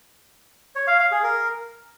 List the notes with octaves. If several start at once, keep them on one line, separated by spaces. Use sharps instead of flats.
C#5
F5
F5
G#4
A#4